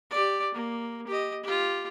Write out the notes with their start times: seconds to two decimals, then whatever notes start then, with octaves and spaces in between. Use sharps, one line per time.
0.11 G4 D5
0.55 A#3
1.08 G4 D#5
1.44 F4 G4